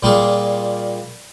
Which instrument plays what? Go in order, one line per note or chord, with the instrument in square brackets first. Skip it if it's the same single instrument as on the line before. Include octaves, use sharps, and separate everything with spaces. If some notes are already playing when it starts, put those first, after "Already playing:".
[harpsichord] A#2 G3 A#3 F4 G#4